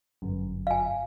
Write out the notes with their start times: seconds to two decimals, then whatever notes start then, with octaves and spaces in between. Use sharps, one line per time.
0.22 G1 F#2
0.67 F5 G#5